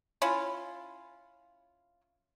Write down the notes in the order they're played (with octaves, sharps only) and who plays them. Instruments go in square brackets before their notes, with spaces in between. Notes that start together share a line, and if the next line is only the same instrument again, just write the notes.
[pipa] C#4 E4 F4